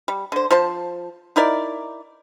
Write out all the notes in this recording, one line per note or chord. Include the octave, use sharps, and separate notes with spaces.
G3
D3 C5
F3 C5 A5
D#4 E4 A#4 D5